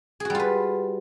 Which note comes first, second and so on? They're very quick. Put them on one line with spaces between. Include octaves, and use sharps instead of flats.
G#4 F#4 G3 F4 B4